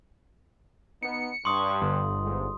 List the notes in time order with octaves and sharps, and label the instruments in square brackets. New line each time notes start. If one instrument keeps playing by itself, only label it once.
[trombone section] B3 D#4 [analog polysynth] C#7
[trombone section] G2 [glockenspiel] C6 D#6 [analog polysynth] C#6
[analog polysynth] G1
[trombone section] G#2